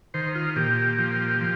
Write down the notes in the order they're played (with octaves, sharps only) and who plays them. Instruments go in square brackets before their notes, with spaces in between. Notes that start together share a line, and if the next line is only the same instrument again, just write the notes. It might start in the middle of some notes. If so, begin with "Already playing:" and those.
[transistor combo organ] D#3 C5
F4
A#2 G4
F3
F3